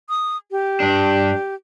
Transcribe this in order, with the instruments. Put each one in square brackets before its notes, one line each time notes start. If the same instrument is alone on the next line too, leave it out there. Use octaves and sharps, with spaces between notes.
[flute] D#6
G4
[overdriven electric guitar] G2 D4